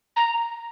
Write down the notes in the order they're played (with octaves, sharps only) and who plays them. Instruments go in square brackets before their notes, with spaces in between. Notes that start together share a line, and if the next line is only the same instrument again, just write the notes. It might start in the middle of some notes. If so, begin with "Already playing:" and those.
[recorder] A#5